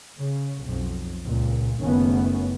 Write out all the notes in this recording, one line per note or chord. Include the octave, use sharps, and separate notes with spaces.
C#3
B1 F2
C#2 A#2
F#1 D#3 A3 B3 C#4